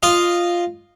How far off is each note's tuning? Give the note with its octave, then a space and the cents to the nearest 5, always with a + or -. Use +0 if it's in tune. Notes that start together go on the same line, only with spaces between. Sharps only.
F4 +0 D#5 -10